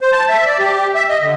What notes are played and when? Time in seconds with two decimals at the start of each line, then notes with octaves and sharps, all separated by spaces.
0.01 C5
0.12 A5
0.29 E5
0.46 D5
0.59 G4
0.95 E5
1.09 D#5
1.22 D3